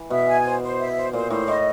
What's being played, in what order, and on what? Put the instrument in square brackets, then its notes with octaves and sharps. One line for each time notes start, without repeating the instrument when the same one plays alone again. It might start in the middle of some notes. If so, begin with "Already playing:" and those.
Already playing: [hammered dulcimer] E3
[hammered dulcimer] B2 [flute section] E5
[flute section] G#5
C5
C5
E5
C5
[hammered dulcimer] A#2 [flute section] C5
[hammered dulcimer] A2 [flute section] C5
[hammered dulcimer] A2 [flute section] D#5